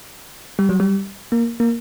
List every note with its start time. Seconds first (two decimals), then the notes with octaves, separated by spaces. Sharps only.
0.59 G3
0.69 F#3
0.80 G3
1.32 A#3
1.60 A#3